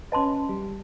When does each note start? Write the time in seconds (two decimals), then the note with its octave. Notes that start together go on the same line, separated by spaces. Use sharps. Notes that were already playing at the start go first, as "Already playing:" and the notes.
0.12 C#4 B4 D#5 A5 C6
0.49 G3